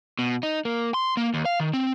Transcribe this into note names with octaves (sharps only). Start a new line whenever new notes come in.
B2
D#4
A#3
C6
A#3
D#2
F5
D#3
C4